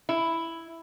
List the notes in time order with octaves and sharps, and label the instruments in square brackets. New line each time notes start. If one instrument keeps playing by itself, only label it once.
[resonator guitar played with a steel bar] E4